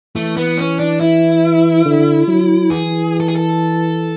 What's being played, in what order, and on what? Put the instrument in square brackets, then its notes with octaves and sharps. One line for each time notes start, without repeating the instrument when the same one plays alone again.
[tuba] E3 [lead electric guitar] A3
[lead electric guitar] B3
C#4
D4
E4
[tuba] D3
F#3
[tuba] E3 [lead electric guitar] G#4
[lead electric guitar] A4
G#4
A4